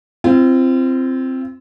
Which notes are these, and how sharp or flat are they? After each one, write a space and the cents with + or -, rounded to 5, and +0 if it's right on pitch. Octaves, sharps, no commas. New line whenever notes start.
C4 +0 F4 -40